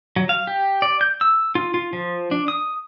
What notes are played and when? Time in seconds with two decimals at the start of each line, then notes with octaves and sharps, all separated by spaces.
0.16 F#3
0.29 F5
0.47 G4
0.82 D5
1.01 G6
1.21 E6
1.55 F4
1.74 F4
1.93 F3
2.31 D4
2.48 D#6